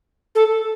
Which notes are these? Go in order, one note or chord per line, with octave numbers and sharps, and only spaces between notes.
A4